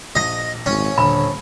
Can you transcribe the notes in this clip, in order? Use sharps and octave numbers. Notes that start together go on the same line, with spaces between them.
A#1 D#5 A#6
G#1 C#4
D#1 D3 B5